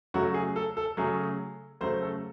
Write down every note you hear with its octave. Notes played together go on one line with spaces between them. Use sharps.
C#3 F#3 A3 F#4
G#4
A4
A4
C#3 F#3 A3 G#4
C#3 F#3 A3 C5
A4